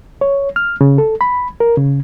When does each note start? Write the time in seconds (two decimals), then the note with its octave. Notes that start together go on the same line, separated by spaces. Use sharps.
0.21 C#5
0.56 F6
0.81 C#3
0.98 A4
1.21 B5
1.60 A#4
1.77 C#3